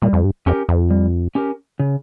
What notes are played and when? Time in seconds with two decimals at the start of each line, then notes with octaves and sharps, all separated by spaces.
0.02 A#2 G3
0.13 F2
0.24 G2
0.46 F2 C#4 G4 A#4
0.69 F2
0.90 G3
1.35 C#4 G4 A#4
1.79 C#3